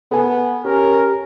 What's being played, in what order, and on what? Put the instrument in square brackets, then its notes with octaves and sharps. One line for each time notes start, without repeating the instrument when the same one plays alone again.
[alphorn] B3 [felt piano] A4 G#5
[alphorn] C#4 [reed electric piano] G4 [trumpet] A#4